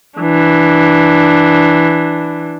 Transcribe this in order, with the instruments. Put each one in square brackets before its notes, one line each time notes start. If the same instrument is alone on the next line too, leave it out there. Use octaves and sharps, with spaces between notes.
[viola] E3 D4